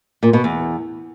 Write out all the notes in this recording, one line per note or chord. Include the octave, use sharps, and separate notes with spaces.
A#2
B2
E2